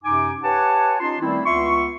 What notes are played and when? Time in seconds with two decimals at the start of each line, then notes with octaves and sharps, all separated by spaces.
0.04 F#2 C3 D#4 G#5 D6
0.43 G4 B4 C#5 F#5 G#5 A5
1.00 C#4 D#4 F4 A5 C6
1.20 D#3 G3 A3 C4 E4
1.46 C#2 B3 F4 E5 C6 C#6